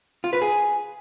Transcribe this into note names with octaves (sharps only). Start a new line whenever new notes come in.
F4
B4
G#4